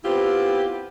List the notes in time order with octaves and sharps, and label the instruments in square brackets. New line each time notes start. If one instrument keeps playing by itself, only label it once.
[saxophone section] B3 C4 E4 F4 G4